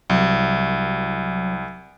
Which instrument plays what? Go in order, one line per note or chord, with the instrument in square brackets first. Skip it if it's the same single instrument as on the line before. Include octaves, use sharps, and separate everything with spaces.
[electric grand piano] C2 [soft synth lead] F#3